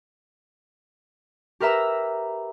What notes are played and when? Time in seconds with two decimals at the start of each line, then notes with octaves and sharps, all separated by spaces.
1.60 G4 A#4 B4 E5 A#5 E6